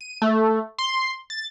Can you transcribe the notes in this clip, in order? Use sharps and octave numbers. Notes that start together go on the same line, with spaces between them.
D#7
A3
C6
A6